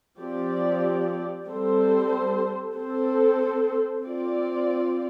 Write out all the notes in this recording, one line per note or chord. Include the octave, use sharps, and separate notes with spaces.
F3 C4 G4 D5
G3 C4 A4 C5
C4 A4 C5
C4 F4 D5